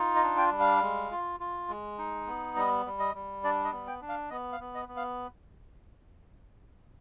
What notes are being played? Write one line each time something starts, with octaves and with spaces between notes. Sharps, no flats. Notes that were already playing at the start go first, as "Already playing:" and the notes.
Already playing: D#4 F4
D#5
D4
G5
G3
F5
G#3
F4
F4
G#3
D#4
B3
G3 D#5
G3
D#5
G3
D4 D5
D#5
B3
G5
D4
F5
B3 D#5
F5
B3
D#5
B3
F5